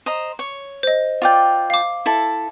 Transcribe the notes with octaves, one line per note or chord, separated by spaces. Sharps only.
C5 D#5 A#5
C#5
C5 D#5
F4 D5 G5
F5 D6
E4 A4 A5